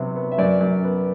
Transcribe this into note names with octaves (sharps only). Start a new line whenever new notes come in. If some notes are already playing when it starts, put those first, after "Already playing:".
Already playing: C3 F#3 B3
B3
E5
F#2 D5
F#2
B3